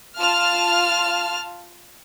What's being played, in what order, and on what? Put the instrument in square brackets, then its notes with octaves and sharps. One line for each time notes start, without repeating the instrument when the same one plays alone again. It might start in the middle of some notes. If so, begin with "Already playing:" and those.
[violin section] F4 A5 F6